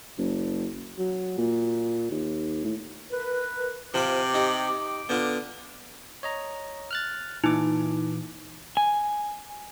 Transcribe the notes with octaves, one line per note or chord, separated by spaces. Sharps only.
F#1
F#3
A#2
D#2
A2
A#4 B4
C3 F3 F4 B5 D6
D#4 G4
D3 B3 F4
C#5 D#5 A#5
F6 F#6 A6
A#2 E3 D#4 E4 D6
G#5